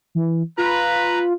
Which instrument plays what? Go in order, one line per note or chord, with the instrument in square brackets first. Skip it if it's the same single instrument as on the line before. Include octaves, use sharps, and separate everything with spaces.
[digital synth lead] E3
[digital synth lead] F4 [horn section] B4 [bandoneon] A#5